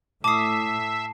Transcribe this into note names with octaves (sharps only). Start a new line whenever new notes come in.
A2 E5 A5 D6 D#6 C7